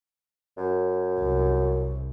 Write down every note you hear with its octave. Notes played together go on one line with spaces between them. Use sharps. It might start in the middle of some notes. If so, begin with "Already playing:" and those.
F#2
C2